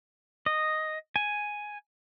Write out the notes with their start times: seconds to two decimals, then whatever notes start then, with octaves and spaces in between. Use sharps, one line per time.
0.46 D#5
1.16 G#5